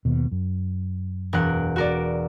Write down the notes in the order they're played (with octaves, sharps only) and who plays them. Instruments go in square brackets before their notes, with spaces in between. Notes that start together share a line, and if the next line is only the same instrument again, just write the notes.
[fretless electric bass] D#2 B2
F#2
[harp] E1 A#4 F#5
F#4 A#4 D5